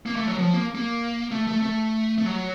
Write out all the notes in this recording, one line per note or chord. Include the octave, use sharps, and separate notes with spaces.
A#3
A3
F#3
F3
A#3
A#3
A3
A3
A3
A3
F#3